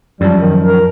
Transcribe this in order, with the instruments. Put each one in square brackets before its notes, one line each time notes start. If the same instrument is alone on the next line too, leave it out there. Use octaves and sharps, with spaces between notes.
[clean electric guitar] F#2 F3 [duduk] G3
[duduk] D#3
A#4